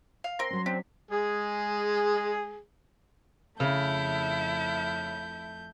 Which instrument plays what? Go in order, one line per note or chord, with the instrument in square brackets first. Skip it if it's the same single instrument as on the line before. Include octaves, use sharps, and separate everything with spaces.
[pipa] F5
[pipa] C4 A#4 [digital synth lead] C6 [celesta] A#6
[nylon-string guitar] F#3 C#4
[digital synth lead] C4 [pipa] D4 [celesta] B6
[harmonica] G#3 G#4
[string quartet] F2 A3 G6 [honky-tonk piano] C#3 [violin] E4